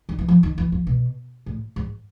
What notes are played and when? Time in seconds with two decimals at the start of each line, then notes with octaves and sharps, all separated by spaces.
0.09 D#3
0.19 E3
0.28 F3
0.43 D#3
0.58 E3
0.72 F3
0.87 B2
1.46 A2
1.76 G#2